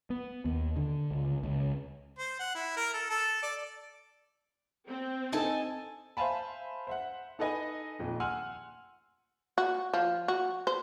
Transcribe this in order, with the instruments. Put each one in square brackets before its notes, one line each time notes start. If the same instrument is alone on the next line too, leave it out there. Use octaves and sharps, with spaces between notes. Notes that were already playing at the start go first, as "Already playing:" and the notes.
[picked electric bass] B3
D#2
D3
C#2
C#2
[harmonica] C5
F#5
E4
A#4
A4
A4
D5
[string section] C4
[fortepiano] D#4 A4 [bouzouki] D#5 G#5 A5
[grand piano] C5 E5 F5 G#5 A5 B5
C5 E5 F#5
D#4 A4 B4 D#5 G#5
D#1 F2
F#5 G#5 C6 E6 F6
[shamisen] F#4
F3
F#4
C5